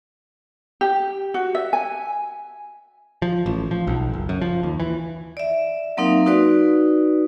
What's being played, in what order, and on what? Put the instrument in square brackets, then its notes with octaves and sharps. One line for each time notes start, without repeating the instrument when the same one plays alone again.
[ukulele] G4
F#4
E5
G#5
[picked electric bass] F3
A1
F3
B1
F#1
F#2
F3
D#2
E3
[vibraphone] D5 E5
F#3 A#3 C4 D#4 A#4 F5
D#4 F#4 B4 D5